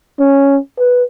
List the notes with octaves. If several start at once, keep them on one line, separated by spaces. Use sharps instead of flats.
C#4
B4